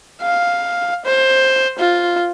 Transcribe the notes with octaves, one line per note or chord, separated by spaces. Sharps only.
F5
C5
F4